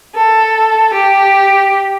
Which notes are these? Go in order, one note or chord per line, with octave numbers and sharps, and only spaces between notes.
A4
G4